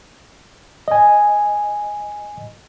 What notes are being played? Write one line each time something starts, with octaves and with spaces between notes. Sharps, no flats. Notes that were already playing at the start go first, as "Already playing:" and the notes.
D#5 G#5